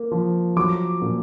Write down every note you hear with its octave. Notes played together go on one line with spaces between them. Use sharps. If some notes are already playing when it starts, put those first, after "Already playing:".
Already playing: A#3
F3
F#3 D6
A#2